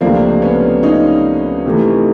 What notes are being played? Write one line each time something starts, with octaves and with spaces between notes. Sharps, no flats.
C#2 C3 F3 A3 A#3 C4 D4
B3 C#4
C#4 D#4
C3 E3 A3